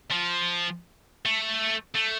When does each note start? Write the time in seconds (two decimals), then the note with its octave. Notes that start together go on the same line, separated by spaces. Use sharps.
0.11 F3
1.26 A3
1.96 A3